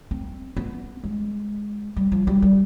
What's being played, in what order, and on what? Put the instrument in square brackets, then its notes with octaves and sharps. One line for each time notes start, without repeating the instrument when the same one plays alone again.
[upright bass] C4
B3
G#3
G3
F3
G3
G3